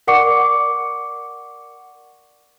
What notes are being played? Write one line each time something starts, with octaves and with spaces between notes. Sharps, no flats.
A#4 D5 F#5 C#6 D6 C#7